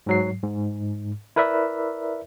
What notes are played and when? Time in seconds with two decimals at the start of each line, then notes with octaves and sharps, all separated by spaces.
0.06 G#2 F#3 C7
0.44 G#2
1.36 E4 A#4 B4 D5 E5